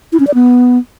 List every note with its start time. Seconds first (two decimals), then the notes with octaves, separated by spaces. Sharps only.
0.12 E4
0.20 C#4
0.27 D5
0.34 B3